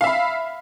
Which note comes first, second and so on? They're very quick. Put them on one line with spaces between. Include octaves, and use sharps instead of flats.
F5 E5 B5